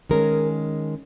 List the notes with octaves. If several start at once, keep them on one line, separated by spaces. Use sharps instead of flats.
D#3 G#3 C#4 A#4